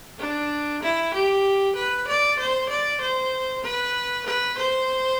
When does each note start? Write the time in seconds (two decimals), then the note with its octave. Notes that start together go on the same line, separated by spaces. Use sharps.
0.19 D4
0.83 E4
1.14 G4
1.76 B4
2.08 D5
2.39 C5
2.69 D5
3.01 C5
3.64 B4
4.26 B4
4.58 C5